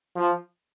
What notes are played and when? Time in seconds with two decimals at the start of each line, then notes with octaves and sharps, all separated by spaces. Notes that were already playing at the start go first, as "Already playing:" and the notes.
0.16 F3